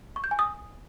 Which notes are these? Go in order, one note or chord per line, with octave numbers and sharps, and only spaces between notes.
C#6
G6
G#5
D#6